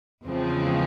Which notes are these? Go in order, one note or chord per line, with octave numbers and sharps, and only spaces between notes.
E2 C#3 F3 G#3 C4